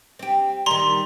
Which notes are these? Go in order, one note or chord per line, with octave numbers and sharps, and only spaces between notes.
C4 G4
D#3 G3 A#5 C6